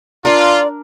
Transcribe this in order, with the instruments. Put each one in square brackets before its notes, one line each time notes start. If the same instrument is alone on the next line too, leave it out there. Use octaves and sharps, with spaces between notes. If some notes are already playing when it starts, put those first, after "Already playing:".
[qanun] D4 A#4 [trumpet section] F4 [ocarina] D5